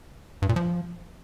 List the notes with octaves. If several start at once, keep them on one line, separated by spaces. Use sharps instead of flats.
G2
A#2
F3